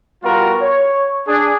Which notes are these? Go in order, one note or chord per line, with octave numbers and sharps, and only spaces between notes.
G3 B3 F4 F#4 A#4
C#5
D4 G#4